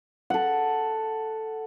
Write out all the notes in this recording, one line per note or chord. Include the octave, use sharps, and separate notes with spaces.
A4 F#5